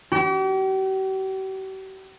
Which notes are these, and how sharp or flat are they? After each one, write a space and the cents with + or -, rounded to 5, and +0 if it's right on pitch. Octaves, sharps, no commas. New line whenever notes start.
G4 -45